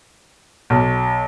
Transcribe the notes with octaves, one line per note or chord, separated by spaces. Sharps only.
B1